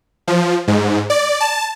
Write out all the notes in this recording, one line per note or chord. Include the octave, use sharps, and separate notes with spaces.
F3
G#2
D5
A5